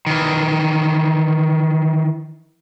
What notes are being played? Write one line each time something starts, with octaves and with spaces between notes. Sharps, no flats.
D#3 E3